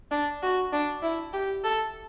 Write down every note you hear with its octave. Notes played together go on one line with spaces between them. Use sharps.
D4
F#4
D4
E4
G4
A4